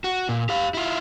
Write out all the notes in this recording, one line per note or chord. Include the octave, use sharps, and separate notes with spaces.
F#4
A#2
G4 F5
E4 F4